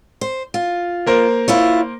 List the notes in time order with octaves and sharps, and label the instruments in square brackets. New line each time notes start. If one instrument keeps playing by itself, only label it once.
[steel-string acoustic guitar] C5
F4
[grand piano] A#3 A#4 C5
[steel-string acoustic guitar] E4 F4 C#5